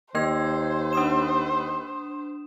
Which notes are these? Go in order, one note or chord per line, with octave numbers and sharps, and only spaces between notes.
D#2 A#3 A#4 C5 D#5 G5 E6 G#6
D4 D#6 E7